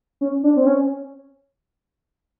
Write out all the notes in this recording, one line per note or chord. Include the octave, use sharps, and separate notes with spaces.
C#4
D4
C4
C#4